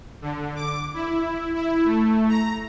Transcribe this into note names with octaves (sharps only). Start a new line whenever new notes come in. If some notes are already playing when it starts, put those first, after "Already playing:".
D3
D6
E4
E4
A3
A#5